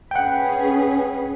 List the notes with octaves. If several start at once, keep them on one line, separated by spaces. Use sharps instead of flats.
C#4 G#4 B4 F#5 G5